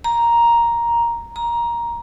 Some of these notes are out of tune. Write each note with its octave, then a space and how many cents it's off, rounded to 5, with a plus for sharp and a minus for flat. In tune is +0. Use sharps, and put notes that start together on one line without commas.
A#5 +5
A#5 +15